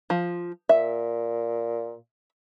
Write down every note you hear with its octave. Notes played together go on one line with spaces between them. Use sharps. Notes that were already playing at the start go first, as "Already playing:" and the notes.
F3
A#2 E5